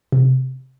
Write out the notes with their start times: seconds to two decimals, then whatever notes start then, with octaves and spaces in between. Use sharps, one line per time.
0.12 C3